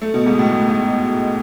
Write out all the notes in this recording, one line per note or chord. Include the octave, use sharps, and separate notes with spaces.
A3
B2
G#2
A2
A2
G#2